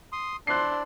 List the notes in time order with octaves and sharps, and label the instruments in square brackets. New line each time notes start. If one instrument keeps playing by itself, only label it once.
[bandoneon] C6 D#6
[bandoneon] D4 D5 [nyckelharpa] E4 C5 [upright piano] F#6 C7